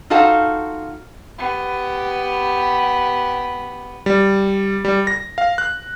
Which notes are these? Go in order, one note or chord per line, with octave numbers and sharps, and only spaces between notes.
D#4 F4 F#4 A4 C5 F5
B3 G4
G3
G3
A#6
F5
F#6